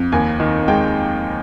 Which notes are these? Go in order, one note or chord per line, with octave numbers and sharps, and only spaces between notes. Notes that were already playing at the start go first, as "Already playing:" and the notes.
Already playing: F2
D#2 G#5
D#3
G#3 G5